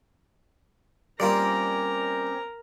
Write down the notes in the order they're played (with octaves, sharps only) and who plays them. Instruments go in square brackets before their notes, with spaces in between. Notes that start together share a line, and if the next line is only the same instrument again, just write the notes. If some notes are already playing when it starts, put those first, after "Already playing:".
[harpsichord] G3 A#3 F4 [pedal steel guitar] C4 C#4 D5 [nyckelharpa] A#4 A#5